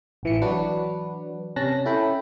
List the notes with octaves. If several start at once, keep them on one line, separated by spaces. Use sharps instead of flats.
A1 E3 C#7
E3 F#3 D4 F#4 B4
C3 C#4 A5 F#6 A#6
C#4 E4 A4 G5 B5